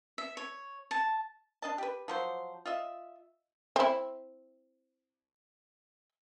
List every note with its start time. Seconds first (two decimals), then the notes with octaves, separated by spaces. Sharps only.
0.18 E5
0.37 C#5
0.91 A5
1.62 D4 D#5 A5
1.78 G4 B4
2.08 F3 F#3 C5
2.65 F4 D#5 E5
3.76 C4 E4